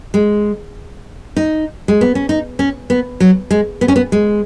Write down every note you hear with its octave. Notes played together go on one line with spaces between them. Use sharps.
G#3
D#4
G#3
B3
C#4
D#4
C#4
B3
F#3
G#3
B3
C#4
B3
G#3